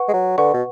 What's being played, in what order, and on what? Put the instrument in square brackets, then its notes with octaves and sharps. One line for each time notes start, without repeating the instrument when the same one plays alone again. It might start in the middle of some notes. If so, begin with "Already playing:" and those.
Already playing: [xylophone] B4 F#5 C#6
[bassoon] G#3
F#3
[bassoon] D3 [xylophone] B4 F#5 C#6
[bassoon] B2